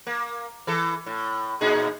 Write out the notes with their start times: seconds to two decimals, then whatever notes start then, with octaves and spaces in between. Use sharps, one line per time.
0.07 A#3
0.67 E3 A4
1.06 A2
1.61 A#2 D#4 G#4